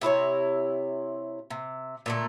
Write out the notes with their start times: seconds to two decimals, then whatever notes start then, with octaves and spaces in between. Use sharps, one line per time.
0.01 C3 E4 G#4 C#5
1.50 C3
2.06 A#2 D3 A3